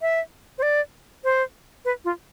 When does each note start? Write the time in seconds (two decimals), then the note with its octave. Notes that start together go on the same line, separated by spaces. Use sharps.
0.02 E5
0.58 C5
0.62 D5
1.24 C5
1.85 B4
2.05 F4